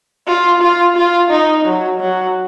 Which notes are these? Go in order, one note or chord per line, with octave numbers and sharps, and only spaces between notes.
F4
F4
F4
D#4
F#3
F#3